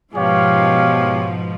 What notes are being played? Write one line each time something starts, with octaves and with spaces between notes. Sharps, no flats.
G#2 B2 F3 G4 C#5 F5